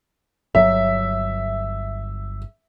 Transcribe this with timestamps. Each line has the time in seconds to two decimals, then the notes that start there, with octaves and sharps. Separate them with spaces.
0.55 G1 F#3 E5